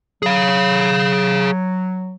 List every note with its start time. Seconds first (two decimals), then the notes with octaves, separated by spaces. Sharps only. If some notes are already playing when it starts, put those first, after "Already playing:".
0.23 F#3 G#4 F5